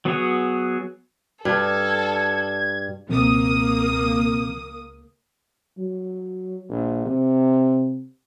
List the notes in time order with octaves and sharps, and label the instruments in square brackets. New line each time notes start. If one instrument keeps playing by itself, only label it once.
[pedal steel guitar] F#3 B3 F#4 G#4 C#5
[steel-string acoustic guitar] G2 [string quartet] A4 [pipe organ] G#6
[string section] C#2 A#3 D#6 [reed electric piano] B2 F3 C4
[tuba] F#3
A#1
C3